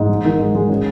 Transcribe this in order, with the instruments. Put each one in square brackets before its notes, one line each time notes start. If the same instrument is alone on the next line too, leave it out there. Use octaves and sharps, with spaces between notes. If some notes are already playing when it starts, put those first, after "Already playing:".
Already playing: [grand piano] G#2
G#3
D#3
G#3
G#3
C#4